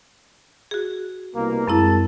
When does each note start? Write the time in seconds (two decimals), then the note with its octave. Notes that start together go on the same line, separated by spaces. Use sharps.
0.71 F#4 G#4
1.35 C2 B2 A#3
1.67 F#2 G#3 C4 E4 A#4 A5